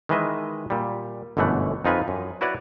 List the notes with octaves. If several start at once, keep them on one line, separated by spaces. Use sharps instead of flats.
D#3 E3 G#3 B4 D#5 E5
A#2 G3
G1 F#2 B2 E3 A3 F#5
F2 D#4 F4 B4 G#5
F#2
E4 F#4 B4 C#5 D5 F#5